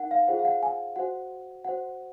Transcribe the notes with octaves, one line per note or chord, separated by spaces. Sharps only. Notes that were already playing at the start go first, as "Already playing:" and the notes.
Already playing: D#4 A#4 F#5
F5
F4 G#4 C5 F#5
F5
F#5
G#5
F#4 C5 F#5
F#4 C5 F#5